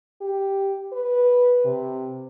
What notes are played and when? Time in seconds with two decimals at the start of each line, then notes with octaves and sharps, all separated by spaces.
0.22 G4
0.93 B4
1.65 C3